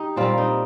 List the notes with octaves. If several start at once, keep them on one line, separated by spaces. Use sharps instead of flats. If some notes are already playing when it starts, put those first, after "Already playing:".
Already playing: D#4 G4
A#2 G3 A#3 C4 F4
D#4